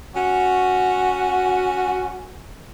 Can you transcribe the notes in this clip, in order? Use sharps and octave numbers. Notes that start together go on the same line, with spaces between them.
C#4 F#4